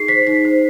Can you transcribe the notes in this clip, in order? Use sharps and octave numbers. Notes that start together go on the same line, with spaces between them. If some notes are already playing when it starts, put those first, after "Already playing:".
Already playing: D#4 G#4 C7
C5 B6
D#4 B6
C5